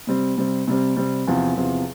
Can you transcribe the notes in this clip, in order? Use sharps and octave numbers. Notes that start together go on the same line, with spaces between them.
C3 G3 C4
C3 G3 C4
C3 G3 C4
C3 G3 C4
E2 C3 F3
E2 C3 F3